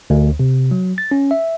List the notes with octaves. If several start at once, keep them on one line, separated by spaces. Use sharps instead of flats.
D2
C3
F#3
A6
C#4
E5